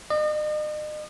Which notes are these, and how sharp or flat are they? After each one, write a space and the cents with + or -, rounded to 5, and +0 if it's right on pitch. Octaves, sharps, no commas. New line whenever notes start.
D#5 -40